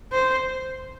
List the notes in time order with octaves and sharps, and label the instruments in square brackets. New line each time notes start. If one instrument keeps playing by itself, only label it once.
[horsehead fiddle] C5